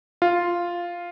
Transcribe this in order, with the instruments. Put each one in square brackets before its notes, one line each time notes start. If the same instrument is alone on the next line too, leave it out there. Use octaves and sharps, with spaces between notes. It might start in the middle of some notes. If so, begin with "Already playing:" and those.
[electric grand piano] F4